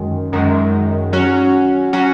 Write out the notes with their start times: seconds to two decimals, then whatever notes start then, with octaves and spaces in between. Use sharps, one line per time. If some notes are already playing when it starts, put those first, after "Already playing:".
Already playing: F#2 D#3 G#3
0.33 F#2 D#3 G#3
1.13 F#3 C#4 F#4
1.93 F#3 C#4 F#4